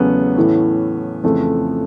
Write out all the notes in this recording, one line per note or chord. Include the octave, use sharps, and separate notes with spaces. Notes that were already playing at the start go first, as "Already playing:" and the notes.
Already playing: E2 C#3 F#3 A3 B3 C#4
A2 E3 A3
F2 C#3 E3 A3